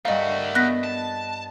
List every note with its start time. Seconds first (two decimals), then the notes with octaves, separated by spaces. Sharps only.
0.05 G2 A3 F#4 A#4 D#5 F5
0.55 B3 D#5 F#6 A#6 B6
0.84 A5